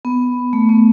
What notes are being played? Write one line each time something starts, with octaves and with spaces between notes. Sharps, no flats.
B3
A3
B3